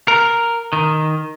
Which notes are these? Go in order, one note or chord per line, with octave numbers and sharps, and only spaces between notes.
A#4
D#3